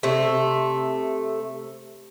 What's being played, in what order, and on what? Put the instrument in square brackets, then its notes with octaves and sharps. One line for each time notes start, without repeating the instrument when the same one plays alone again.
[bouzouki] C3 A3